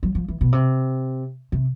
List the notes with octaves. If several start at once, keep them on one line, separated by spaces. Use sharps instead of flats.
F#3
F3
E3
B2
C3
C3